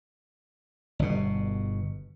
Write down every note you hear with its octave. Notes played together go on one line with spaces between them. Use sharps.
G1 B2